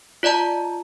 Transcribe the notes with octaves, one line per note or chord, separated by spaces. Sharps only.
F4 D5 D#5 A5 A#5